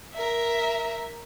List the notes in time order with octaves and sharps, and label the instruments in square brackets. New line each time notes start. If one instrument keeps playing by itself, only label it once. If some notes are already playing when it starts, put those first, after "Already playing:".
[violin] A#4 E5